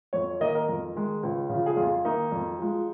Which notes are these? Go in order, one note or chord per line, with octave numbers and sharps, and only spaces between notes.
F2 C#5
D#3 A#3 D#5
A#4
F2
D#3 G#3
C#2
C#3 F3
G#4
F2 F4
D#3 A#3 D#4
F2
F3 G#3